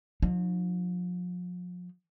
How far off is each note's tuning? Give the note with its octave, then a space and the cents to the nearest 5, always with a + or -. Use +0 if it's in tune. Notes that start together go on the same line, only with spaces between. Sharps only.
F3 +40 D#4 -30